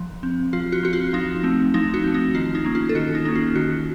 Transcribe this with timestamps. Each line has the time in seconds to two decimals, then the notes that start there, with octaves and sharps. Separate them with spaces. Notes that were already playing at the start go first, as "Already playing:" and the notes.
Already playing: F3
0.23 C4
0.53 F3 F4
0.72 F#4
0.83 C4 F#4
0.93 F4
1.13 F3 D#4
1.43 A3 C4
1.74 F3 D#4
1.94 F#4
2.04 A3 C4
2.14 D#4
2.34 D#3 F4
2.55 D#4
2.65 A#3 C#4
2.75 F4
2.89 A4
2.95 D#3 F#4
3.15 D#4
3.25 A#3 C#4 D#4
3.35 F4
3.55 D#3 F#4